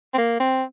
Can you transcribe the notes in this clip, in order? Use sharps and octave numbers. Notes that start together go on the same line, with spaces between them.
C4
A#3
C4